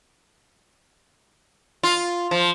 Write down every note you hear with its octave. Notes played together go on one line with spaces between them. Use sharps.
F4
F3